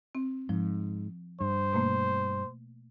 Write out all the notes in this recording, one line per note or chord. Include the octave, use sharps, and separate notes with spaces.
C4
G#2 F3
G2 C5
B2 A3 A#3